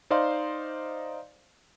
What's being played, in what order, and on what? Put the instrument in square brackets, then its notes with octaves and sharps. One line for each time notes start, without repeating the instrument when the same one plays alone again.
[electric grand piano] D#4 C5 D5 D#5 F5 C6